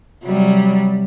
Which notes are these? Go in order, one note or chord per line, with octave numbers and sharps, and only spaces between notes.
C3 F#3 G3